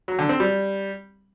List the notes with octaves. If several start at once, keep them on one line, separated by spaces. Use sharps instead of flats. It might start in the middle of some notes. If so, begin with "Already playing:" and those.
F#3
D3
C4
G3